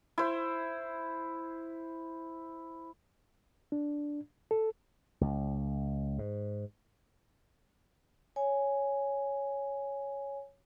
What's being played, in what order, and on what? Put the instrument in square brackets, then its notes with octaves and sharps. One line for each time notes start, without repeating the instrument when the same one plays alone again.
[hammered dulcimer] E4 C5
[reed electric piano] D4
A4
[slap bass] C#2
G#2
[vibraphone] C#5 G#5